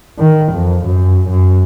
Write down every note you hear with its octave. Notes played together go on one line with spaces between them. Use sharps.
D#3
F2
F#2
F#2